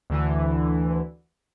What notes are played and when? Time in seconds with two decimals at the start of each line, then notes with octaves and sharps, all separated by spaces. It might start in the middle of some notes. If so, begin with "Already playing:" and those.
0.10 D2 D3 E3